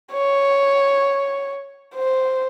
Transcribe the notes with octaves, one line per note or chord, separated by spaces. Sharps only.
C#5
C5